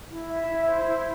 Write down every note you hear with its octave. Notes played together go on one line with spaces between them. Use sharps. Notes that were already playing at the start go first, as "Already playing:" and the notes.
E4
E5
E4
C5
E4